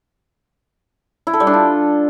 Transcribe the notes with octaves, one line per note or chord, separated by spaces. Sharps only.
E4
A4
G3
D4
F4